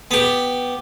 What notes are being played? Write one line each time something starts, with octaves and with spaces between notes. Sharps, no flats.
B3 G4